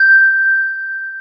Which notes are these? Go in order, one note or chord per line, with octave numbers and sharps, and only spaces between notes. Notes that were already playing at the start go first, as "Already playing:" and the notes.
Already playing: G6